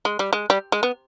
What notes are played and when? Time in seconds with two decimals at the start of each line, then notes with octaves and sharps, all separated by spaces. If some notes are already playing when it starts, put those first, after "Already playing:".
0.05 G#3
0.19 G3
0.33 G#3
0.50 G3
0.72 G#3
0.83 B3